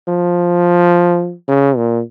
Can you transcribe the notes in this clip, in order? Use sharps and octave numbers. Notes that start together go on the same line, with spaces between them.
F3
C#3
A#2